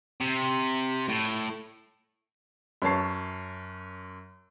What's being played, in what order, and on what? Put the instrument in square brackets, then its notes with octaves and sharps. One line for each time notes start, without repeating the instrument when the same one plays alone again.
[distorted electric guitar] C3
A2
[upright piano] F#2 C#5 A5 C7